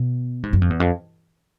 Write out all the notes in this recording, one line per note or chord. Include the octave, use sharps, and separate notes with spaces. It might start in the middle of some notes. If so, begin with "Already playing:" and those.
Already playing: B2
G#2
F#2
F2
E2
F2